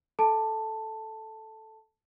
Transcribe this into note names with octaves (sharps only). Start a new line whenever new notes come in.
A4 A5